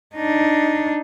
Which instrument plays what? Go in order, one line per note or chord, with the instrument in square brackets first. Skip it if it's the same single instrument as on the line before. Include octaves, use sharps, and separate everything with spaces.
[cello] D4 D#4